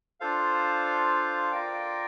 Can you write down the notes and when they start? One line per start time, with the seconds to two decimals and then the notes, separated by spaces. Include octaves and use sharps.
0.20 D4 F4 A4 C5 F5
1.52 F4 A#4 D5 G5